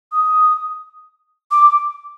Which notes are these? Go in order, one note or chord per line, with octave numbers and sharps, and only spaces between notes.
D#6
D6